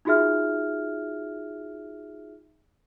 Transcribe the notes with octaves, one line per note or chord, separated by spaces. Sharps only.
D#4 F4 F#4 G#4 E5 F6